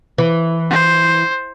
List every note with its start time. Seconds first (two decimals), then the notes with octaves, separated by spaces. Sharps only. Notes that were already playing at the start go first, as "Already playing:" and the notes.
0.18 E3
0.71 C5